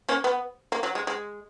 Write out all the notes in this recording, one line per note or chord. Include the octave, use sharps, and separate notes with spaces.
A#3 C#4
B3
A#3
F#3
G#3
G#3